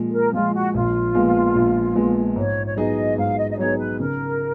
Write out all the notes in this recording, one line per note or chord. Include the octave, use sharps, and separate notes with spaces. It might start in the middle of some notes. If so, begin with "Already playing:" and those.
Already playing: A#2 F3 G#3
G#4
A#4
F3 G#3 F4
F#4
A#1 F4
A#2 F3 G#3 B3
A#1
A#2 F3 G#3 B3
G#2 C#5
C#5
F#3 B3 D#4 G#4 D#5
G#2 F5
D#5
D#5
F#3 B3 D#4 G#4 C#5
B4
C#3 A#4